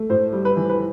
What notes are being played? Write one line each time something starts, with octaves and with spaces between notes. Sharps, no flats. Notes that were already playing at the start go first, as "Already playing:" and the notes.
Already playing: A3
A2 C5
G3
B4
E3
B4